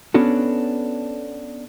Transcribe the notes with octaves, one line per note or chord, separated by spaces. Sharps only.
B3 C#4 D4 F#4 A4